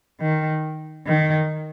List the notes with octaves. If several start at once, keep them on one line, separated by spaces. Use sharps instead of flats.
D#3
D#3